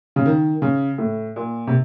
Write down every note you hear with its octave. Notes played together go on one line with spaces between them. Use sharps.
C#3
D#3
C#3
A2
A#2
C3